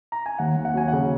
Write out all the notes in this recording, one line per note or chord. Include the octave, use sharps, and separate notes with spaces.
A#5
G#5
D#2 F#5
D#2
F#5
F#3 G#5
C#3 F#5